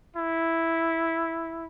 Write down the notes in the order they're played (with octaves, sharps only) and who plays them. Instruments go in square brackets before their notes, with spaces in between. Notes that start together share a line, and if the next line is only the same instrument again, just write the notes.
[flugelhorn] E4